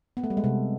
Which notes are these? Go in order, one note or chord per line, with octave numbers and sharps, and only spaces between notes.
B3
A3
G3
G#3
C3